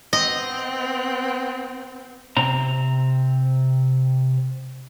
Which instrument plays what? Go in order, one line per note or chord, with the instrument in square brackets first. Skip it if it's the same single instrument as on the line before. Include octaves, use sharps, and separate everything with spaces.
[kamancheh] B3 C4 [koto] D#5
[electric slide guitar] C3 C4 A#5